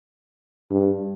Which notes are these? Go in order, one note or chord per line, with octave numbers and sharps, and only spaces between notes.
G2